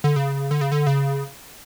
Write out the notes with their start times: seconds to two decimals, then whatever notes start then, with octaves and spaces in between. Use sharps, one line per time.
0.04 D3
0.16 C#3
0.51 D3
0.61 C#3
0.72 D3
0.87 C#3